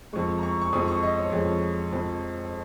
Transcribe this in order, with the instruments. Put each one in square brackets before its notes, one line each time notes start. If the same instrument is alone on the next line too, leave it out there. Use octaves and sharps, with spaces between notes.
[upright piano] F2 F3 G#3 C#6
A#5
C#6
C#6
F2 F3 G#3 D#6
C#6
D#5
C#5
F2 F3 G#3 G#4
F2 F3 G#3